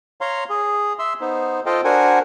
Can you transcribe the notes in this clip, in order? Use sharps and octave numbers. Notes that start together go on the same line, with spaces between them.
C#5 F5 A#5 C6
G#4
E5 C6 E6
B3 D#4 C5
F4 A4 C5 D#5 F5 G5
D4 F#4 A#4 C5 F#5 G#5